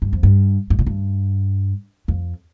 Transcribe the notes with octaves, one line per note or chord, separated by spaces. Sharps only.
G2
F2
G2
G2
A#2
G2
F2